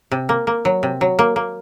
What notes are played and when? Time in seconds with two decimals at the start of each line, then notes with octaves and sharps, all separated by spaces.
0.11 C3
0.29 A#3
0.47 A#3
0.65 F#3
0.83 C3
1.01 F#3
1.19 A#3
1.36 A#3